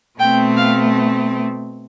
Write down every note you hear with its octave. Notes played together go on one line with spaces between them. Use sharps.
B2 A3 C4 G5
F5